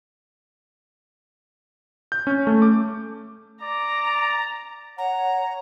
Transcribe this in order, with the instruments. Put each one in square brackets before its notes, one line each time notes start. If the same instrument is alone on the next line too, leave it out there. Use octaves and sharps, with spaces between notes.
[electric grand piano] G6
C#4
A3
D6
[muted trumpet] D5 [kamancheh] A#5
[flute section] C#5 F#5 [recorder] A#5